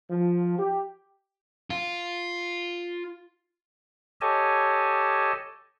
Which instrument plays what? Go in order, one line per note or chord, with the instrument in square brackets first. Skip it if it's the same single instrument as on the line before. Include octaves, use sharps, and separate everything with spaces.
[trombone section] F3
G4
[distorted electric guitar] F4
[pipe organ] G4 A4 C#5 D#5 G#5 A5